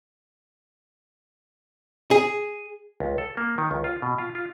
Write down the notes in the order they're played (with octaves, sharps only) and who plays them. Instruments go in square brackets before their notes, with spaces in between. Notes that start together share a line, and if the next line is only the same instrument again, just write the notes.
[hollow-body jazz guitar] G#4
[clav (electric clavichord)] C#2
A4
A#3
D#3
C#2
F4
B2
F4
F4